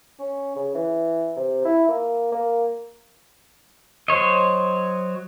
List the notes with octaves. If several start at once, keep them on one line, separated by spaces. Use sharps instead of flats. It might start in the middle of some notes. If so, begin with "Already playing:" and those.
C#4
C#3
E3
C3
E4
A#3
A#3
F#3 C5 C#5 D#5